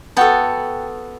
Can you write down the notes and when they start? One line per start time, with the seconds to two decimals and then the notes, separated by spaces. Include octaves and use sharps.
0.17 B3 F#4 A4 F#5 G5 A5